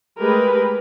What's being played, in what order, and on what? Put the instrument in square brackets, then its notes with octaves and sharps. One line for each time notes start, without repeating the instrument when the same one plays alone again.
[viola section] G#3 A3 G4 G#4 A#4 B4